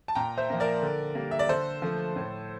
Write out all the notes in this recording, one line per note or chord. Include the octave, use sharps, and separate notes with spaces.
A5
A#2 G5 A#5
C5 E5
F3 A#3
A#4 D5
D3
G3 A#3
E5
D5
D3 A4 C5
F3 A3
A2